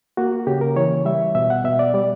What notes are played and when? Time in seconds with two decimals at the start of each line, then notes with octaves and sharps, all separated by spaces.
0.17 A#3 F#4
0.47 C#3 G4
0.61 A#4
0.76 E3 C#5
1.05 G3 E5
1.35 B2 E5
1.50 F#5
1.64 B2 E5
1.79 D5
1.94 G3 D5